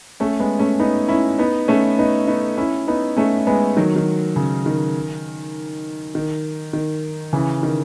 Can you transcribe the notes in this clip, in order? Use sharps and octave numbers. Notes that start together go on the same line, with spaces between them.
A3 C#4
G#3 B3
A3 C#4
B3 D#4
C#4 E4
B3 D#4
A3 C#4
B3 D#4
B3 D#4
C#4 E4
B3 D#4
A3 C#4
G#3 B3
D#3 F#3
D#3
C#3
D#3
D#3
D#3
C#3 E3
D#3